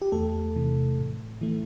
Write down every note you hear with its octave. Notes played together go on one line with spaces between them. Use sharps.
G4
E2 A3 A4
C3 E3
A2
E3 A3